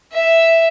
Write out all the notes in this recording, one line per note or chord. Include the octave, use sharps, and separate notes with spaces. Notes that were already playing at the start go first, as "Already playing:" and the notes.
E5